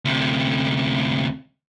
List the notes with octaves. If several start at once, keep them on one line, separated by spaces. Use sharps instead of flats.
D2 C3